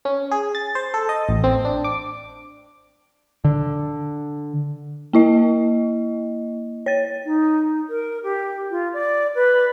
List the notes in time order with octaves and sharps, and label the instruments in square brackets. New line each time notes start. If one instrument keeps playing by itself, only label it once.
[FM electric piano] C#4
G#4
A6
C5
A4
D#5
A1
C4
D4
D6
[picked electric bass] D3
[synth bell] A#3 E4 D#5
C#5 A6
[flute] D#4
A#4
G4
F4
D5
B4